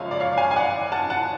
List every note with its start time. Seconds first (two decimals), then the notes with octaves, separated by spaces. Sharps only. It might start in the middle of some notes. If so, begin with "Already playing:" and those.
Already playing: F#1 F#2 F3 G#3 C#5 F5
0.11 D5
0.20 C#5 F5
0.38 F5 G#5
0.51 G#5
0.56 D5 F#5
0.92 F#5 A5
1.10 F#5 A5